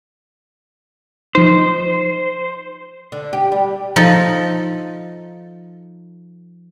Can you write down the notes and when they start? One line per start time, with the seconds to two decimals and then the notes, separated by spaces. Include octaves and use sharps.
1.35 F3 D#4 C5
3.12 D3
3.33 G4
3.52 G3
3.96 F3 D#4 A4